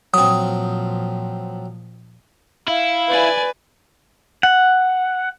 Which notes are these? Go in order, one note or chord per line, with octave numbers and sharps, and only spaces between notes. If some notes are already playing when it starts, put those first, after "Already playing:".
A#2 F3 F#3 C4 D#6
E4 F5
B4 D5 G#5
F#5